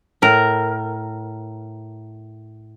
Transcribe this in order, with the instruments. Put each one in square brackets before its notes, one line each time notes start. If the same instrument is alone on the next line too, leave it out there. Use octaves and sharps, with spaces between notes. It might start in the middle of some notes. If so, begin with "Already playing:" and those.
[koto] A2 A#4